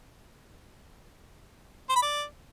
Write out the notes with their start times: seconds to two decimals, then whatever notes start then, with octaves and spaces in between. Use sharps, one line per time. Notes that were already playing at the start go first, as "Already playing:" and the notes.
1.90 C5
1.96 B5
2.03 D5